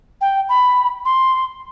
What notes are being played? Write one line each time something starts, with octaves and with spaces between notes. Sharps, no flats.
G5
B5
C6